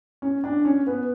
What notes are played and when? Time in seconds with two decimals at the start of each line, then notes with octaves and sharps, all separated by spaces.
0.22 C#4
0.44 D4
0.65 C#4
0.87 B3